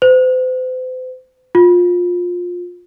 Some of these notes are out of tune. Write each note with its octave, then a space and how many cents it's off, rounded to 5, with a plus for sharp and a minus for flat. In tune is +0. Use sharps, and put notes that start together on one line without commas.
C5 -40
F4 +20